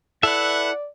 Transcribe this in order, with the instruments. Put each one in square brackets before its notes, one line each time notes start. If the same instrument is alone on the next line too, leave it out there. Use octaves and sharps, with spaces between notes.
[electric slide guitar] E4 A4 [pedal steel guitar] B4 E5 [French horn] D5 [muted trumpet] F#5